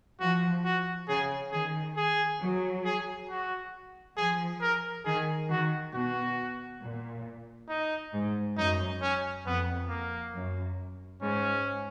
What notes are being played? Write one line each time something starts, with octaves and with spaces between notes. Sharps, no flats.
F3 F#4
F#4
C#3 G#4
D#3 G#4
G#4
F#3
G#4
F#4
F3 G#4
A#4
D#3 G#4
D#3 F#4
B2 F#4
A#2
D#4
G#2
F#2 D#4
C#4
F2 B3
A#3
F#2
G#2 C#4